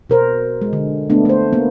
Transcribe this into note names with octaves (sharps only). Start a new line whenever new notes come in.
B2 A#4 C5
G#3
D3
A3 B3 D4
A3 C5
A#3 B3